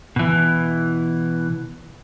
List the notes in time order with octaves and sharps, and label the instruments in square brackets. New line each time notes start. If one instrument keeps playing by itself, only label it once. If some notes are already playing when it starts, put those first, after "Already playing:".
[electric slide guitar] B2 E3